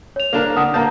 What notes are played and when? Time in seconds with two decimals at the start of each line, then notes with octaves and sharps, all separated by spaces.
0.16 C#5 F7
0.33 A#3 D4 A4 A#4
0.56 D3 F#5 D#6
0.74 A#3 A5 A#5 G6